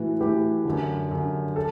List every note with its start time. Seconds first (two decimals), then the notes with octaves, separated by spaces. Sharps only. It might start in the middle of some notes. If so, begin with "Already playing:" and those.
Already playing: A2 E3 F#4
0.20 A2 E3 G4
0.65 F#2 D3
1.11 F#2 D3
1.56 A4